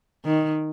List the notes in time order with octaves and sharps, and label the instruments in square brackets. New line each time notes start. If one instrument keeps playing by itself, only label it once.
[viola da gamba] D#3